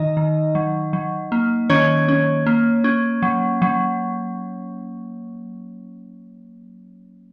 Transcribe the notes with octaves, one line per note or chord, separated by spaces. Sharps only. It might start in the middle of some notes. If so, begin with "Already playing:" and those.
Already playing: D#3 D#4 D#5
D#3
F#3
F#3
A#3
D#3 C#4 C#5
C#4
A#3
C#4
F#3
F#3